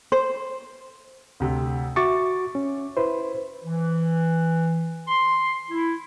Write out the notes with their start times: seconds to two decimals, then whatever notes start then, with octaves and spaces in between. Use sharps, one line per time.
0.12 C5
1.40 D2 C3
1.96 F#4 E5 C#6 D6 A6
2.55 C#4
2.97 E4 B4 C5
3.65 E3
5.08 C6
5.71 E4